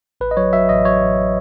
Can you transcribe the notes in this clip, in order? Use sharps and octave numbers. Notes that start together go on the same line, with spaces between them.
A1 B4
D#5
F#3 C#5
F#3 E5
A1 D#5
F#3 C#5
A1